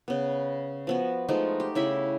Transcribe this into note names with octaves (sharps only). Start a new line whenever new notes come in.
C#3 B3
F3 B3 F#4
F3 G#3 A3 D#4
G4
C#3 E4 E5 B5